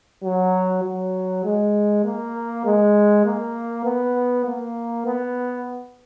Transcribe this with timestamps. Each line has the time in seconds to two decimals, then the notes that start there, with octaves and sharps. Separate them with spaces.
0.23 F#3
0.84 F#3
1.44 G#3
2.04 A#3
2.65 G#3
3.25 A#3
3.85 B3
4.45 A#3
5.06 B3